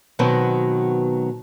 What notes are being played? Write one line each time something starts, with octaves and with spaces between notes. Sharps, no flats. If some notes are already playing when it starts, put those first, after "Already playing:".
B2 D#3 F#3 B3 C4